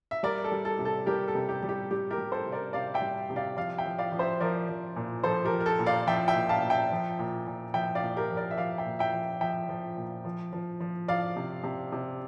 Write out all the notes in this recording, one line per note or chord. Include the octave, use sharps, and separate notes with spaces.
E5
G3 A#4 D5
A4
G3
A4
C3
A4
G3 G4 A#4
A4
C3
G4
G3
G4
G3 G4
G4 A#4
G3
A4 C5
C3
A#4 D5
C3 D5 F5
E5 G5
G3
C3
D5 F5
F3 D5 F5
E5 G5
F3
D5 F5
F3
C5 E5
F3 A#4 D5
F3
A#2
F3 A4 C5
G4 A#4
F3
A#4
A4
A#2
D5 F5
F3 E5 G5
E5 G5
A#2
F5 A5
A#2
E5 G5
F3
A#2
A#2
F3 E5 G5
D5 F5
A#2
G4 A#4
F3
A#4 D5
E5
F3 D5 F5
E5 G5
A#2
E5 G5
F3
F3 E5 G5
F3
A#2
F3
F3
F3
F3 D5 F5
C3
C3
C3